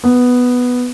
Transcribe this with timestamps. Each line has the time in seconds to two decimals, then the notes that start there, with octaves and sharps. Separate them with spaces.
0.04 B3